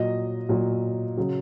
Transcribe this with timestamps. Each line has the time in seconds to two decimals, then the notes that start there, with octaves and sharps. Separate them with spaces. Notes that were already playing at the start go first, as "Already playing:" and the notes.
Already playing: A#2 F#3 D#5
0.49 A#2 F#3
1.18 C#3 F#3